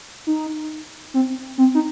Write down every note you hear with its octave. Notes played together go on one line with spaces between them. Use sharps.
D#4
C4
C4
D#4